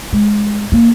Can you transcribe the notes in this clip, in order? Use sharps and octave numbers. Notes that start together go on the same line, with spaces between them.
G#3
A#3